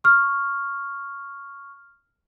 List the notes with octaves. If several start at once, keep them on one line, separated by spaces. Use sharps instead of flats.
C#6 F6